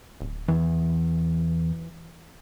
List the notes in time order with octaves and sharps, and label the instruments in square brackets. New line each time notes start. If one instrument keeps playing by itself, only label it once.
[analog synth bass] D1
[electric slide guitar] E2 [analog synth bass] E3